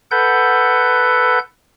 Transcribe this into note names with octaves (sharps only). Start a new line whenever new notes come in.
A4 B4 F#5 G6